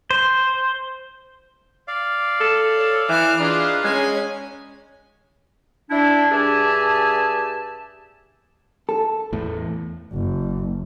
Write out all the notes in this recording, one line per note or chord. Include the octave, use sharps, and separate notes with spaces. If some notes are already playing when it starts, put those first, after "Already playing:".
C5
D5 F5
A4
C#5
E3 D6 F6
D4 D#4 F4 G#4 B4 F5
G#3 C#4 G#5
D4 E4
G2 G4 G#4 E5 G#5 A5
A4
E2 A2
F#1